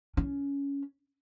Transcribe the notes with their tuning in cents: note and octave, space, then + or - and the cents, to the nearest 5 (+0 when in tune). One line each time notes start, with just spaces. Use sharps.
C#4 +15